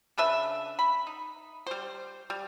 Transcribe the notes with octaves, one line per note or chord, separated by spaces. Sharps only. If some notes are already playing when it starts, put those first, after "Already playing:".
C#3 D4 B4 E5
B5
D#4
G3 C5
G3